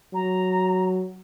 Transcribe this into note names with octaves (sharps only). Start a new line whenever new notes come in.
F#3 A#5